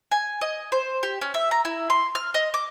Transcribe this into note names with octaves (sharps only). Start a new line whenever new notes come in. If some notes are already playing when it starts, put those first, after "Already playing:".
G#5
D#5
C5
G4
C#4
E5
A#5
E4
C6
F6
D#5
D6